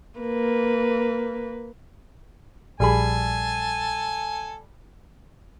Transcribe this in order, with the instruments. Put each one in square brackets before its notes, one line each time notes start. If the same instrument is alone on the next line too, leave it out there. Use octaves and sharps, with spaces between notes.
[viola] A#3 B4
[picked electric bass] A#1 [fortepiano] G3 G#4 B5 [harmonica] A4 G#5